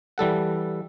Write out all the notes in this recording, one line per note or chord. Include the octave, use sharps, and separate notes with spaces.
E3 G3 A4 F#5